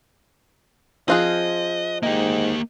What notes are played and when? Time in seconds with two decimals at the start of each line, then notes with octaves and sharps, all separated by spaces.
1.08 F3 C4 F4 G#4 D#5 F#6
2.03 G#2 A#3 G4 D#5 G5